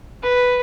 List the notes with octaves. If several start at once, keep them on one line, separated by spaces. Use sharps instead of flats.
B4